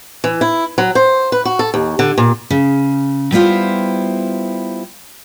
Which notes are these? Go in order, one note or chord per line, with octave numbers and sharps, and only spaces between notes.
E3
E4
F#3
C5
B4
F#4
A4
D#2
D3
A#2
C#3
G3 B3 E4 F4 C5